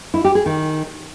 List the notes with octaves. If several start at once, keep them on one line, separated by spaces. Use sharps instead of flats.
E4
G4
G#4
D#3